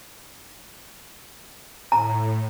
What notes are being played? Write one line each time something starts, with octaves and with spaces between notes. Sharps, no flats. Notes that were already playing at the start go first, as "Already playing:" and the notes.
A2 A#5